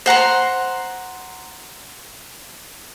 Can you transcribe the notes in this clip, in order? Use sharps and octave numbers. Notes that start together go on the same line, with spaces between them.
C5 F#5 A#5 C6